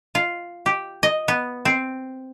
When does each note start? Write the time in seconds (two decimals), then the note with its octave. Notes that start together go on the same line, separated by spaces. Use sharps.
0.15 F4
0.66 G4
1.03 D#5
1.28 B3
1.65 C4